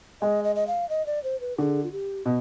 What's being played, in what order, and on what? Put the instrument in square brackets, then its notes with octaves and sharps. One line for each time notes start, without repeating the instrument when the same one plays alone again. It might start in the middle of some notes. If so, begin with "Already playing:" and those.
[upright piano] G#3 [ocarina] D#5
[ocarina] D#5
D#5
F5
D#5
D5
C5
B4
[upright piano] D3 [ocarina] G#4
[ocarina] F4
G4
[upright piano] B2